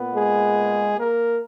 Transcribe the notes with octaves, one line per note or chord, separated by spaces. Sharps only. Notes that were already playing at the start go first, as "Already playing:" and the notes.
Already playing: A#2 B3
G#3 G#4
A#3 A#4